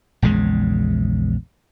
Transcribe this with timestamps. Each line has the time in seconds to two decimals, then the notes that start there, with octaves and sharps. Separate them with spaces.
0.22 A#1 E2 C#3 G#3